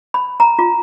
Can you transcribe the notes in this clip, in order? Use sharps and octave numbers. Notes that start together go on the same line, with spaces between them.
B5
A#5
F4